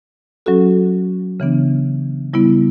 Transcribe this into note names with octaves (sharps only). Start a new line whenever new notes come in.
F#3 C#4 F#4 A4
C#3 E3 B3 D4
C#3 G3 B3 E4